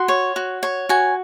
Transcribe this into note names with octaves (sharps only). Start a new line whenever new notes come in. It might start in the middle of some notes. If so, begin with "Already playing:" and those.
Already playing: F#4 C6
C#5
F#4
C#5
F#4 G#5